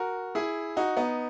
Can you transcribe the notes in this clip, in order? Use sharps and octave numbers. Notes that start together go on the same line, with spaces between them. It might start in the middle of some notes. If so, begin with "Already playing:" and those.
Already playing: F#4 A#4
E4 G#4
D#4 F#4
B3 D#4